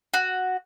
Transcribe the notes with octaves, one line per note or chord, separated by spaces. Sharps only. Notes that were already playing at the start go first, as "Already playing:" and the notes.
F#4